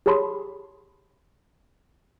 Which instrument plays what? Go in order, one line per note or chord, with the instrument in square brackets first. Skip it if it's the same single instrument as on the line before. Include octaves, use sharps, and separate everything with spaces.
[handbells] G4 G#4 C#5 A5 B5 C6